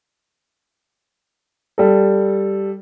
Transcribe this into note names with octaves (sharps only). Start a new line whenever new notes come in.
G3 A4